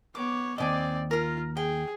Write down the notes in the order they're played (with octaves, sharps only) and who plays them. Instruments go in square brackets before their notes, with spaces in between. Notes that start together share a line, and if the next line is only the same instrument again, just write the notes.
[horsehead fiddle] B3 C#5 [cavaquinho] D6
[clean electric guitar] D#2 B2 D#5 [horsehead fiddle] C4 D5 [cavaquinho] G#5 D6
[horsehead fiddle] F4 [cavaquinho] A#4 A#5
[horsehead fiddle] G#4 [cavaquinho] G5